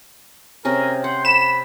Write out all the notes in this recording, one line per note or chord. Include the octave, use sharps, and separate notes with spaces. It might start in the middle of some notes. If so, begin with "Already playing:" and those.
C3 C#4 G#4 A#4
C5 F#5
B5 E7